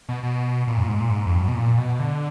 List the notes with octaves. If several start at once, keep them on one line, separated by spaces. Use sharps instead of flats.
B2
B2
A#2
F#2
A#2
G#2
A#2
G#2
F2
F#2
B2
A#2
B2
D3